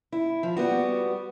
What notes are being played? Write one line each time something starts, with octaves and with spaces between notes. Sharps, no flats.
E4
F3
G3 B3 F#4